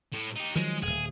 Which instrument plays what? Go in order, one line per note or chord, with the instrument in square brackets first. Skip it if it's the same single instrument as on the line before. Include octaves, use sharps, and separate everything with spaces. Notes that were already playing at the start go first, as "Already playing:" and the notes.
[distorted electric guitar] A2
D#4 G4
[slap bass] D#3 F3 F#3 [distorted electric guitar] G#3
[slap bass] D1 G1 [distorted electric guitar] G#4